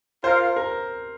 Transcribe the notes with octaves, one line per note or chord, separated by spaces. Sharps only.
F4 A#4 C5 F5
A#4